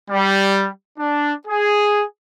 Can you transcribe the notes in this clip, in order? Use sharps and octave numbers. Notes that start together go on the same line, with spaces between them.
G3
D4
G#4